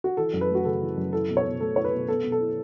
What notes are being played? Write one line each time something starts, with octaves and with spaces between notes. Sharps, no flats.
F#4
E3 A4
F#2
B4
A3
F#4
C#3 A4
E3
F#2
E4 A4
B2
C#5
B2
A3 A4
E4 C#5
B4
B2
B3 A4
B2
A4
E4